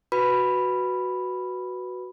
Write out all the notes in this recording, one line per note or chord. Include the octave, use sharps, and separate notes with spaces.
F#4 B4 B5